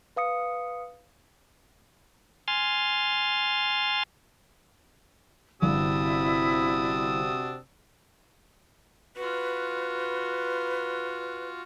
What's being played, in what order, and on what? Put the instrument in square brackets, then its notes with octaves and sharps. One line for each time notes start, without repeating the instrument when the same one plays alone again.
[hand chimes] B4 F5 D#6 C#7
[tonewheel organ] G#5 C6 F6 A6
[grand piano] G1 [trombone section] C3 C4 F#4 [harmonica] D4 D#6 E6 [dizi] E4
[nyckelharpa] F4 F#4 [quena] B4